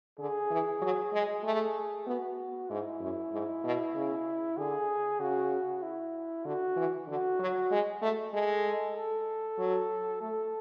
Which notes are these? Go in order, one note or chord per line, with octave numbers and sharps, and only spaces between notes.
D3 G#4
E3
F#3
G#3
A3 G#4
B3 F#4
G#2 E4
F#2
G#2
B2
C#3
D3 G#4
C#3 F#4
E4
D3 F#4
E3
D3 F#4
F#3
G#3
A3
G#3 A4
A4
F#3
A3 A4